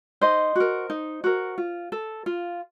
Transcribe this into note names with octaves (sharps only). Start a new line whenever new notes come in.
D#4 C5 D#5
F#4 A#4
D#4
F#4 A#4
F4
A4
F4